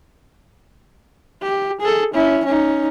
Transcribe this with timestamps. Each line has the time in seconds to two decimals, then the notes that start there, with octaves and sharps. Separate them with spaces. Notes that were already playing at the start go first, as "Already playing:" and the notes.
1.42 G4
1.81 G#4 A4
2.14 C#4 E4
2.45 C#4 D#4